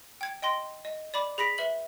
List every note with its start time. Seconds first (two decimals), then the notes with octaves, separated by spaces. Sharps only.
0.21 G5 G#6
0.42 D#5 G5 C6 A#6
0.85 D#5
1.14 D5 B5 D6
1.38 G#4 B5 A#6 B6 D7
1.58 B4 E5 F#7